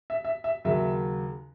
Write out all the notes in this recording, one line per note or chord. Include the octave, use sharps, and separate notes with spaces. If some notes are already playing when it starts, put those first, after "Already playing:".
E5
E5
E5
D#2 C#3 F#3 E5